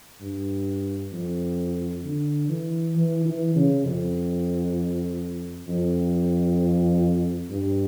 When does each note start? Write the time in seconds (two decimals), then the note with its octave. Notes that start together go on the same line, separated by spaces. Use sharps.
0.21 G2
1.12 F2
2.03 D3
2.49 E3
2.95 E3
3.25 E3
3.55 C#3
3.85 F2
5.68 F2
7.50 G2